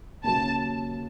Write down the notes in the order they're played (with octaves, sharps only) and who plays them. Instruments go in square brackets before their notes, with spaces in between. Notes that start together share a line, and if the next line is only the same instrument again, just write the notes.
[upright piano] D#2 C#3 F#3 [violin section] A5